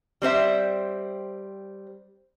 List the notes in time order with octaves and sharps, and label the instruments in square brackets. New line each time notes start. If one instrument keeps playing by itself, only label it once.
[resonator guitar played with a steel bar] G3 C4 C5 E5